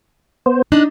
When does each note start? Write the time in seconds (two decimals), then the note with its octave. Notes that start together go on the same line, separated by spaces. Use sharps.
0.46 B3 C5
0.72 D4 D#4 F#6